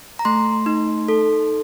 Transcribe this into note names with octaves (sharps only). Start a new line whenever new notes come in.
A#5
A3 C6
D#4
A4